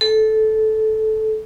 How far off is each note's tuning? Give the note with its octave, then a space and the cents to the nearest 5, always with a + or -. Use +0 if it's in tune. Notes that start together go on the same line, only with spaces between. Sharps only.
A4 -15